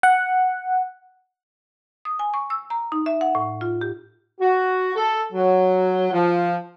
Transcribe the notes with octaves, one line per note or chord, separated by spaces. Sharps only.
F#5
D#6
G#5
C#6
E6
A#5
D#4
E5
F#5
A2
F4
G4
F#4
A4
F#3
F3